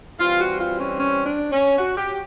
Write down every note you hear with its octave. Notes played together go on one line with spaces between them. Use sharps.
E3 G3 C4 F4
F#4
F4
C#4
C#4
D4
C#4
F#4
G4